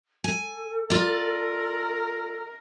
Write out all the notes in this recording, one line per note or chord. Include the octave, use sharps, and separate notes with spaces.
A4 G#5
F4 A#4 D5